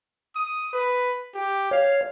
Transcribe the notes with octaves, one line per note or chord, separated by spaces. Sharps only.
D#6
B4
G4
C#5 F5